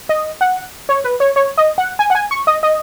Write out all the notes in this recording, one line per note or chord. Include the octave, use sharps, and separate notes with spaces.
D#5
F#5
C#5
B4
C#5
C#5
D#5
F#5
G#5
F#5
G#5
C#6
D#5
D#5